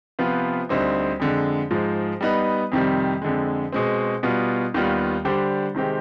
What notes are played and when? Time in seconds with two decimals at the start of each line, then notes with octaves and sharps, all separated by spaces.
0.19 C3 F3 B3 F4 B4
0.69 D2 D3 G3 C4 D#4
1.20 F2 D3 G#3
1.71 G#2 F3 G#3
2.21 G3 B3 D#4 B4
2.72 F2 C3 D#3 G3
3.22 F2 D3 G#3
3.72 B2 G#3 C4
4.23 B2 G3 B3 F4
4.74 D#2 D#3 G3 B3 F4
5.25 D3 G3 D4 G4 C5
5.74 C3 D#3 G#3 C4 G4